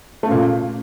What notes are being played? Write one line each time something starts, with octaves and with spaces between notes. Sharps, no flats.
A#2 C#3 A3